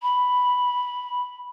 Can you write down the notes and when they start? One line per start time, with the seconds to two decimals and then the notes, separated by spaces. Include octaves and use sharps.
0.02 B5